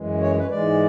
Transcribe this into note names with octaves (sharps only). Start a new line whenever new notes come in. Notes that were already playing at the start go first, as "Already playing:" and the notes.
Already playing: F#2 E3 G#3
C#5
B4
G#2 E3 G#3 D5